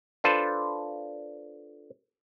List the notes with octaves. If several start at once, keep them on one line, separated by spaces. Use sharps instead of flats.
D4 F4 A4 B4 C5